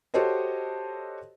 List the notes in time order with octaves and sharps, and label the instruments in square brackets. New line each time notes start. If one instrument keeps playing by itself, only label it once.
[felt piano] F#4 G4 A4 C5 C#5 D#5